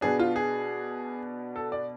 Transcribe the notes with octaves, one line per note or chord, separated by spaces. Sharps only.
B2 B3 D4 G#4
F4
G#4
A4
D5